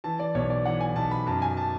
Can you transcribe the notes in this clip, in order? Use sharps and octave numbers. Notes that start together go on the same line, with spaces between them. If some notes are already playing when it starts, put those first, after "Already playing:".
E3 A5
D5
B1 C#5
D5
E3 F#5
G#5
B1 A5
B5
F#2 A5
G#5
A5